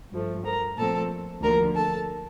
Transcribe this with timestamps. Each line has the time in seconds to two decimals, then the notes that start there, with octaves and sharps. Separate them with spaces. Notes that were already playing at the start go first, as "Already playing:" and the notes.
0.13 G2 F3 A3
0.45 A#4 A#5
0.77 A#2 F3 A3 C4 A4 A5
1.42 D2 D3 F3 A#3 A#4 A#5
1.75 A4 A5